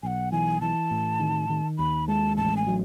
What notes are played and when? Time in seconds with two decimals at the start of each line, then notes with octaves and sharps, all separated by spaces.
0.03 B1 F#5 G#5
0.32 E3 G#5
0.61 E3 A5
0.91 A2
1.20 D#3
1.49 D#3
1.78 D#2 B5
2.08 G#3 A5
2.37 A1 A5
2.57 G#5
2.67 F#3